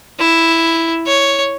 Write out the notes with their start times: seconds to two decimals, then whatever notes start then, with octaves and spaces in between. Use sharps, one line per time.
0.19 E4
1.07 C#5